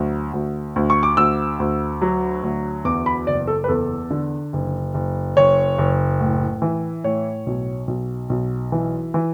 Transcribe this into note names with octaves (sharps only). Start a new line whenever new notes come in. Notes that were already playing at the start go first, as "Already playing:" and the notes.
Already playing: D2 F#3
D2
D2
C#6
D6
D2 E6
D2
F#3
D2
E2 D6
B5
F#1 D5
A4
B4
E2 A4
D3
F#1
F#1
F#1 C#5
F#1
A2
E3
A2 C#5
B1
B1
B1
E3
E3